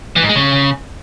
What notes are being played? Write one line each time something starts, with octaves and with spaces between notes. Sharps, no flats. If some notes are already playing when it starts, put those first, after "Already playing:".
E3
G#2
G#3
C#3